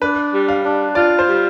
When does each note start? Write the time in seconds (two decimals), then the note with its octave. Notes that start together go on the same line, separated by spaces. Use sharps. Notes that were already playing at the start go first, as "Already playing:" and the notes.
0.01 D4 B4
0.33 G3
0.48 F5
0.64 D4
0.95 F4 D5
1.19 C5
1.27 G3